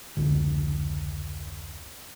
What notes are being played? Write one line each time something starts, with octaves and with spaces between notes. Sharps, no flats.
F1 C#2 D3